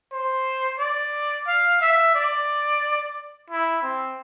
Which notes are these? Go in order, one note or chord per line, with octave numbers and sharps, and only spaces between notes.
C5
D5
F5
E5
D5
E4
C4